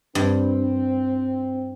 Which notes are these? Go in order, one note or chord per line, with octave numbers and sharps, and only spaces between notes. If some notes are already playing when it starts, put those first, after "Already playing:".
G2 C4